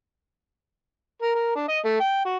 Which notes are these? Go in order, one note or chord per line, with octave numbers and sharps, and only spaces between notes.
A#4
A#4
D4
D#5
A3
G5
F#4